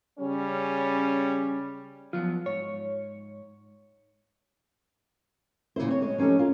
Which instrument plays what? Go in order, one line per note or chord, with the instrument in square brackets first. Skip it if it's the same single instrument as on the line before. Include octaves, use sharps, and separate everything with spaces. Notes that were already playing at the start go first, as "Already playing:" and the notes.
[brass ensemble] C#3 G3 C#4
[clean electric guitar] F3 F#3 B3 [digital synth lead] F4
[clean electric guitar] G#2 [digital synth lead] C#5
[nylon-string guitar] A#2 C#3 F3 E4 C5
C4 C#5
G#3 C#5
F3 C#4 D#4 G4 A4
C#4 F4 A#4